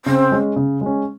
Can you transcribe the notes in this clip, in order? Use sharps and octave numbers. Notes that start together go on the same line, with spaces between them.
C#3 C4
G#3 C#4
C#3
G#3 C#4